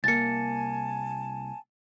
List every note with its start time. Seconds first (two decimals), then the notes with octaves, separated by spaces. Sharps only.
0.04 C2 A#3 G#5 A5 A6 C#7